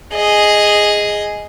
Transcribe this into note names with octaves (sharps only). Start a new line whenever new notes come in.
G#4 D#5